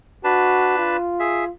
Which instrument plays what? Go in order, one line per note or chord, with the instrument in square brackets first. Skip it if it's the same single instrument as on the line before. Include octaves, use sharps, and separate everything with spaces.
[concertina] D4 B4 A5 [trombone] F#4
[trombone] F4
[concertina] G#4 E5